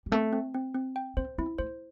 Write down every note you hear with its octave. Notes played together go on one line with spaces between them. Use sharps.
G3
A3 C4
C4
C4
C4
G5
C4 C5
C4 E4
A3 C5